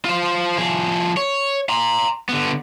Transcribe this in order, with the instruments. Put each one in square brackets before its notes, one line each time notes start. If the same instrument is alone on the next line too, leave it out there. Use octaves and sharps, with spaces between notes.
[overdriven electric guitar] F4 C5
F3 G#4
C#5
A#5 C6
D3 B3